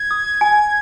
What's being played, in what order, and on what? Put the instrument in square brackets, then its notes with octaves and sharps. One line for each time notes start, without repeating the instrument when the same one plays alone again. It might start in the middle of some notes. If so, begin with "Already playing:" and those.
Already playing: [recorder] G#6
[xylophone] D#6
G#5